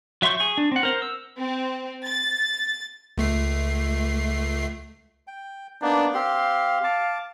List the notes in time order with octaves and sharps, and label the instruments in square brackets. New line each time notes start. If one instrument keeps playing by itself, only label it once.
[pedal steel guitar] F#3 E5 C6 C#6 G6
G#4 C#6
D4
C4 F#5
A#4 C5
E6
[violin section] C4
A6
[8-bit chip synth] C#2 A3 C7
[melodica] G5
[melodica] A#3 B3 D#4 [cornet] D4
[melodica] C4 G4 C6 [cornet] F5
[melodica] A5 D6